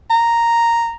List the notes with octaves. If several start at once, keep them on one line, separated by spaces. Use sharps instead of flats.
A#5